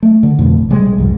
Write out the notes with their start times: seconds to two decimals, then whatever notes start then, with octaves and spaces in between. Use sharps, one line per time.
0.03 A3
0.23 D3
0.39 F2 B2 A3
0.58 A1
0.70 A#1 C3 G3 G#3
0.98 C2 F2 G#2 D#3